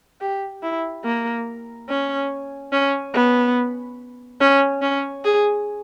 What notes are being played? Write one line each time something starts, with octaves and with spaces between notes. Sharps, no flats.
G4
E4
A#3
C#4
C#4
B3
C#4
C#4
G#4